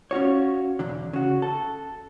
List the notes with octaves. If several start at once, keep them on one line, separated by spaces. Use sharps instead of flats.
C#4 F4 F#4 C#5
B1 E2 D3
C#3 F#4
A4